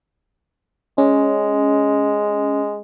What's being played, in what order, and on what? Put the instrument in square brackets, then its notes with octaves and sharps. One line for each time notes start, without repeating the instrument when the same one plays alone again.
[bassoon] G#3 [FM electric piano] C#4